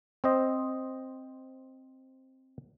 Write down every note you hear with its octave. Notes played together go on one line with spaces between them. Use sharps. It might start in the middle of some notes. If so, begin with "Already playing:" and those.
C4 C5 D#5